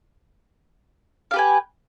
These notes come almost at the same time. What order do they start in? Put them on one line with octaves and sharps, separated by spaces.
F5 G4 B4 G#5